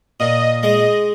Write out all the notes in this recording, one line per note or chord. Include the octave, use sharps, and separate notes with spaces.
A#2 D#5
G#3 D#5